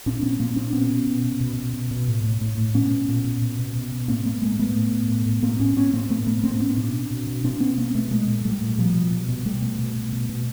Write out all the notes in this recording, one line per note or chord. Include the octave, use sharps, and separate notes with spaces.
A#2 C4 D4
A#2 B3 C#4
A#2 A#3 C4
A#2 C4 D4
B2 B3 C#4
B2
B2
B2
B2
B2
B2
B2
A2
A2
A2
A2
A#2 B3 C#4
A#2
A#2
A#2
B2
B2
B2
B2
A2 A#3 C4
A2 A3 B3
A2 G#3 A#3
A2 A3 B3
A2
A2
A2
A2
A2 A#3 C4
A2 B3 C#4
A2 B3 C#4
A2 A#3 C4
A2 A3 B3
A2 A3 B3
A2 A#3 C4
A2 B3 C#4
B2 C4 D4
B2
B2
B2
B2 C4 D4
B2 B3 C#4
B2 A#3 C4
B2 A3 B3
A#2 G#3 A#3
A#2
A#2 G3 A3
A#2
B2 F3 G3
B2
B2
B2
B2 G3 A3
B2
B2
B2
B2
B2